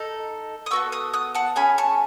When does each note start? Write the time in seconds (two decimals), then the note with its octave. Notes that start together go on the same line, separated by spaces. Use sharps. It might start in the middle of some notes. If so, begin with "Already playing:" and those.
Already playing: D#4 A4
0.66 D#6
0.71 B3 F#4 A4 C#6 E6
0.92 D#6 F#6
1.13 D#6 F#6
1.34 F#5 A5
1.56 C#4 G#4 G#5 B5
1.78 A5 C#6